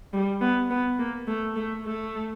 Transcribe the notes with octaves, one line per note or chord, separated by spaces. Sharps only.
G3
B3
B3
A#3
A3
A3
A3